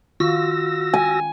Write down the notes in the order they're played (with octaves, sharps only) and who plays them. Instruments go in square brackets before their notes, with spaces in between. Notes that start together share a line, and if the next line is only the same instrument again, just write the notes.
[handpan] D#3 F4 [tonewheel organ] F#4 E6 A#6
[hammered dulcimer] G#5